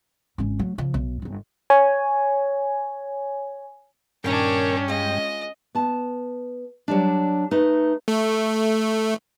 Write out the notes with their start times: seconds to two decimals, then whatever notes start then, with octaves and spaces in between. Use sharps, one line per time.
0.38 G#1 C#4
0.59 F#3 A3
0.78 C#3 F3
0.94 B1
1.22 D1 G1
1.70 C#5 G#5
4.24 G2 A#2 D#3 C#4 D4 A#4 C#5 G5
4.88 G#3 F4 D#5
5.75 B3 A5
6.88 F#3 G3 D4
7.51 A3 D#4 B4
8.08 A3